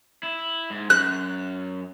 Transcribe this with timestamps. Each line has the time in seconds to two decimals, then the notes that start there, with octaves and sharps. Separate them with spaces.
0.23 E4
0.70 G#2
0.90 F#2 F#6